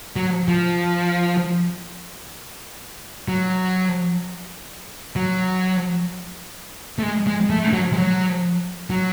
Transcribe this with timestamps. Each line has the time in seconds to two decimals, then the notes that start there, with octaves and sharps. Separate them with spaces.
0.16 F#3
0.48 F3
3.28 F#3
5.16 F#3
6.99 A3
7.03 G#3
7.27 G#3
7.50 A3
7.73 F#3
7.93 G#3
7.97 F#3
8.90 F#3